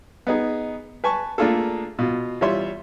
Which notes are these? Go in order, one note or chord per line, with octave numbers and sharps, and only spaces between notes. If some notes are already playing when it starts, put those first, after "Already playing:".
B3 D#4 G#4
B4 G#5 A5 C#6
A3 A#3 D4 F4 G#4 A4
B2 F4
E3 G3 F4 C#5 E5 C6